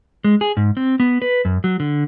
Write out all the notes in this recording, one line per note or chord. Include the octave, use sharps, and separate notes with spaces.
G#3
G#4
G#2
C4
B3
B4
F#2
F#3
D3